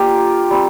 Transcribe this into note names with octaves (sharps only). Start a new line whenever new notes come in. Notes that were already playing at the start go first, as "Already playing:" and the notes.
Already playing: A#3 D4 F4 G4
G3 C4